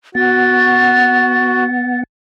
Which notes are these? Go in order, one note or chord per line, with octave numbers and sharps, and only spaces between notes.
B3 F#4 F#5 A6